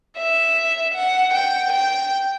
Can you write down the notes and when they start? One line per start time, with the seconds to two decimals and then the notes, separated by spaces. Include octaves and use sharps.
0.17 E5
0.94 F#5
1.34 G5
1.72 G5